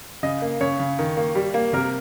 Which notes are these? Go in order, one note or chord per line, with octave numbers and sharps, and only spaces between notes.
C#3 D#5
A#3
C#3 C#5
C#3
D#3
A#3
G3
A#3
C3 A#4